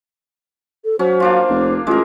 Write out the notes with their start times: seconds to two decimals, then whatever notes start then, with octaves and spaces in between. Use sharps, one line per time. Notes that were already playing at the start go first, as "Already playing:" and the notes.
0.85 A4
0.99 F#3 C#4 C5
1.20 A#3 D4 F4
1.50 F1
1.87 A1 G#3 F4 A#4